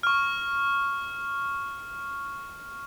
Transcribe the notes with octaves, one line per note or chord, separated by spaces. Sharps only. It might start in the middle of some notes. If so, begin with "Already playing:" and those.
C#6 F6